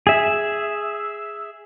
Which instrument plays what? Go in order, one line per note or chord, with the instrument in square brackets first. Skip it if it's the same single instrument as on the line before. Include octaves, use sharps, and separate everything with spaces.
[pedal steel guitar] G#4 E5